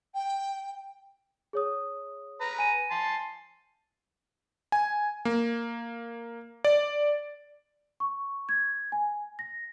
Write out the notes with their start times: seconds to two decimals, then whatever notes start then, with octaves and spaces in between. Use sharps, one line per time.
0.15 G5
1.53 G#4 C#5 D#6
2.41 B4 A#5
2.58 G#5 D#7
2.91 A5 C6
4.72 G#5
5.25 A#3
6.65 D5
8.00 C#6
8.49 G#6
8.92 G#5
9.39 A#6